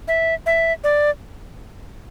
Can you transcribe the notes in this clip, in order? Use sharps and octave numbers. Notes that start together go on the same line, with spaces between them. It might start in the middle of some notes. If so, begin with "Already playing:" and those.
E5
E5
D5